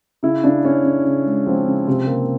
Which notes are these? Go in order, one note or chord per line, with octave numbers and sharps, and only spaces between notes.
C#3 E4
C#3 D4
C#3 C#4
C#3
C#3
G#3
F3 C4
C#3
C3 C4
C3 A#3